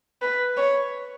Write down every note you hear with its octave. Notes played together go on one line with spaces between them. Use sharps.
B4
C#5